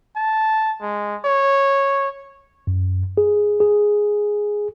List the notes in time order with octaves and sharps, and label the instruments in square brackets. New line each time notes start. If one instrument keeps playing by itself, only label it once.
[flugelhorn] A5
G#3
C#5
[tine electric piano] F#2
G#4
G#4